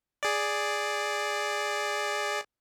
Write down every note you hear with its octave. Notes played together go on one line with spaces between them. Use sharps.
G#4 D5